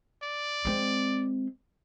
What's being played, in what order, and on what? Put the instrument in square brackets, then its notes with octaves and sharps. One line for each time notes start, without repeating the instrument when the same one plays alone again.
[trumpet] D5
[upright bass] G#3 C4